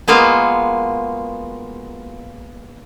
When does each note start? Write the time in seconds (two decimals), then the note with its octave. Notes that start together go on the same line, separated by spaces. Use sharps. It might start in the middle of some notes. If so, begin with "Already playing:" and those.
0.08 G#3 A#3 B3 F4 F#4